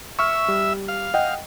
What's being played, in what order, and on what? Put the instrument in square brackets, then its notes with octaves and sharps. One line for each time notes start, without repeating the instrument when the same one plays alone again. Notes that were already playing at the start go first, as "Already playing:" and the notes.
[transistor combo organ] E5 [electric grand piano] C#6 F6
[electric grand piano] G3
[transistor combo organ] F5
[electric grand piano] D#5 F#5 G5